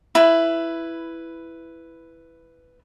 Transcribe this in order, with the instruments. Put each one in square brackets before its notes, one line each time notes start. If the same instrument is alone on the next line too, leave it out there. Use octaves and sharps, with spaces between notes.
[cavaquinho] E4 B4